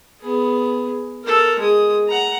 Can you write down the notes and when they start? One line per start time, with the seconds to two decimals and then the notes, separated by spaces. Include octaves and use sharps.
0.21 B3 G#4
1.24 A4 A#4
1.59 G#3 D#6
2.08 F#5 A#5